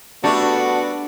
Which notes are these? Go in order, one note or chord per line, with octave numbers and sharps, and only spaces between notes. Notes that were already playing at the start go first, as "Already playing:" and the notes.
G3 A3 B3 D4 F#4 A4